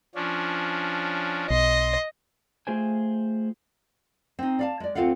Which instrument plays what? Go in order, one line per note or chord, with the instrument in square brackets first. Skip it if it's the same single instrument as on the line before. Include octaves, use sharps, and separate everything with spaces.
[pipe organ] F3 C#4 D4
[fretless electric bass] B1 [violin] D#5 [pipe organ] C6
[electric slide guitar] A3 F4 G#4 C5 G5 G#5
[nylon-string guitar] C4 D#4
D5 F5 A5
G#3 D5
D2 C4 F4 A4 F5 F#5